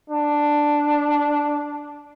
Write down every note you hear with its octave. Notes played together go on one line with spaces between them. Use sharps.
D4